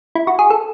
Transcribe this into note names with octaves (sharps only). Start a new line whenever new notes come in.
E4
F#4
G#4
A4